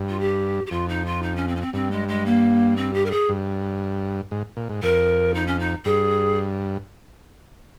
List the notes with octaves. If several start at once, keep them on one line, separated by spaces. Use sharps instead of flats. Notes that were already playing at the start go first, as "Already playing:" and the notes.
Already playing: G2
F4
G4
G4
F2 F4
D#4
F4
D#4
C#4
C4
C#4
C4
G2 C4
G#3
G#3
A#3
C4
G4
A#4
G#4
G2
G#2
A#2
G#2
F2 A#4
D#4
C#4
D#4
G2 G#4